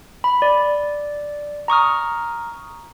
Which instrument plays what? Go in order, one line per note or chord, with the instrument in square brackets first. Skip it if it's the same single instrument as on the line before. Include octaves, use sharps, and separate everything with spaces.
[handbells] B5
D5
A#5 C#6 D#6 F6